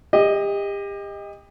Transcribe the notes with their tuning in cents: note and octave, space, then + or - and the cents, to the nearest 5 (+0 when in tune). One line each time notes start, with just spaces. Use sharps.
G4 +35 D#5 +5